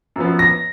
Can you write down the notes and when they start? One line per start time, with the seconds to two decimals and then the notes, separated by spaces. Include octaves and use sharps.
0.16 F#2 F3 B3
0.39 A#6